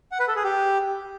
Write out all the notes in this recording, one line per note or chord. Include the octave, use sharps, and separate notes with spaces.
F#5
B4
A4
G#4
G4